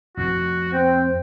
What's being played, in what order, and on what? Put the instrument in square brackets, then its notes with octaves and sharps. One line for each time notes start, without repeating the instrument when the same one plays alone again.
[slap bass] F2 A2 F3 [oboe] F#4
[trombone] C4 [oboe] G5